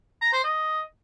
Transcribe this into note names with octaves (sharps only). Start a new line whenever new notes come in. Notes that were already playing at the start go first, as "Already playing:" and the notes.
A#5
C5
D#5